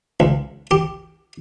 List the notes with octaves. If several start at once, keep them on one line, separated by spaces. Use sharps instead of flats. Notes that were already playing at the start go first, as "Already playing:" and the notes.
C#2
G4